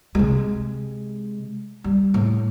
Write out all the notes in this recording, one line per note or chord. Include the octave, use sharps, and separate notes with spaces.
C3 G#3
G3
A2